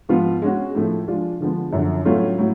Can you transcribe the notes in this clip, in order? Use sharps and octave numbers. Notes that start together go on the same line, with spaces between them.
G#2 F3 B3 F4
G#3 C#4 F#4
A2 F3 A3
F3 G#3 D4 F4 G#4
D3 F3 G#3 B3
F#2 D3 F3
A2 F#3 A3 C#4 F4
A2 F#3